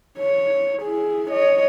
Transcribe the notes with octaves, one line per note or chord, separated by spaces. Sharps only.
C#5
E4 G#4
C#5 D#5